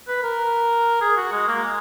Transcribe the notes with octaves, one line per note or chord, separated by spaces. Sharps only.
B4
A#4
G#4
F#4
G#3
A#3
G#3